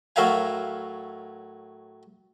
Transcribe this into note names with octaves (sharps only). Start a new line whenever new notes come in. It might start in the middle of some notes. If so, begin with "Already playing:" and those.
A2 F#3 A#4 E5 F5 G#5